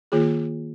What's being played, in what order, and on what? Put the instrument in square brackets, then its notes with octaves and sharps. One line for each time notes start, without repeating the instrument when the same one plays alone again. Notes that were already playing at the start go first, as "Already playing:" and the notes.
[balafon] D#3 A#3 F4 G#4